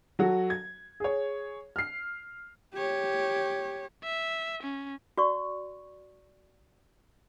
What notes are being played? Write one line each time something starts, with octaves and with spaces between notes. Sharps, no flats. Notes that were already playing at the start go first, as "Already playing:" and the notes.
F#3 F#4 A4
G#6
G#4 C#5
F6 C7
G4 C#5
E5
C#4
F#4 D5 C#6